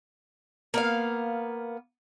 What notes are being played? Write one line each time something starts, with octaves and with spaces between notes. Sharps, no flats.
A#3 B3 F5